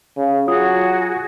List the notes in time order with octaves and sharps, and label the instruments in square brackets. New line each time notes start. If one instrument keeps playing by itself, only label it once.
[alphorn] C#3
[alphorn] F#3 [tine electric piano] F4 D#6 [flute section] F#4 G#4